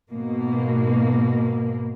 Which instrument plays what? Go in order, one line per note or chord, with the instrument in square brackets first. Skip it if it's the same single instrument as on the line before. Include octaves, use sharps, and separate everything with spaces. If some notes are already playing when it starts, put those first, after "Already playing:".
[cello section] G#2 B2 A#3